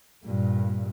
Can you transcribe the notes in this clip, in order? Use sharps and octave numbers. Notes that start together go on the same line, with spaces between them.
G2 A#2